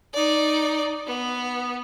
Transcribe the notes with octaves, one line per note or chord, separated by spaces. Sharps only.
D#4 D5
B3